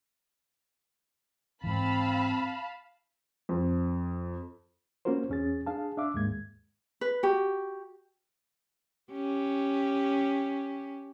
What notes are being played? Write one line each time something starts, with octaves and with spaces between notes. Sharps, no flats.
G#2 E3 C4 F5 A5 B5
F2
A#3 C#4 F4 F#4 A#4 C5
E2 C#4 G#4 A6
D4 G#4 F5 A5
D4 E5 F5 D6
D#2 G#2 G#3 A#3 G#6
B4
F#4 G4
C#4 G4